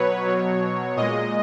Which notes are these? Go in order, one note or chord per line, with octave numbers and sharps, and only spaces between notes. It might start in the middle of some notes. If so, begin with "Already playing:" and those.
Already playing: B2 F#3 B4 C#5
B2 F#3
A#2 G#3 D#5